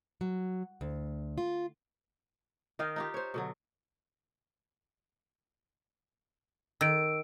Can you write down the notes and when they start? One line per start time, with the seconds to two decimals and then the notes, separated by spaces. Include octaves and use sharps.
0.21 F#3
0.81 D2
1.38 F4
2.79 D#3 D#5 F5 G5
2.96 D#4 F4 G4
3.14 C5 C#5
3.34 B2 D3 F#3
6.81 D#3 E6 D7